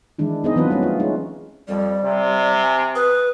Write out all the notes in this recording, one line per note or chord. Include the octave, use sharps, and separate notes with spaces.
D#3 E3 G#3 D4 E4
B3 D4 D#4 G#4 C5 D#5
E3 F#3 B3 C4 F4 B4
G3 A3 C4 C#4
F4
G#3 C#4 D#4
F2 G3 D5
C3
G#5
B4 D#6